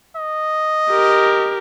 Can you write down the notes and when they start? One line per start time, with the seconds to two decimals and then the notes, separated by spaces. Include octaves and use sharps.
0.16 D#5
0.91 G4 A#4